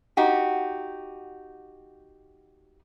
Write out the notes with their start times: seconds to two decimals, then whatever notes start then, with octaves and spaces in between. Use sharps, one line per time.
0.17 D#4 F#4 G4